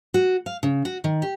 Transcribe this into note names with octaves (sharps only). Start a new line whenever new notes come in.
F#4
F5
C#3
F#4
D#3
G4